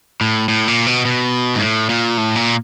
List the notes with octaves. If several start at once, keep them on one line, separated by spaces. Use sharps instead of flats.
A2
A2
A#2
B2
B2
G#2
A2
A#2
A2
A#2